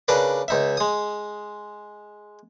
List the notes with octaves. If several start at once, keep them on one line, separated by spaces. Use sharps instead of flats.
C#3 D4 A#4 B4 D5 D6
C#2 D#4 E5
G#3 D#6